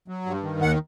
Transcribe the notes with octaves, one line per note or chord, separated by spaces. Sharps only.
F#3
G2
D#3
D#2 F#5